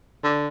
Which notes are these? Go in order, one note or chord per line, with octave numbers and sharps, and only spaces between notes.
D3